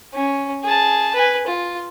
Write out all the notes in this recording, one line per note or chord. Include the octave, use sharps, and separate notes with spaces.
C#4
G#4 A5
B4 G#5
F4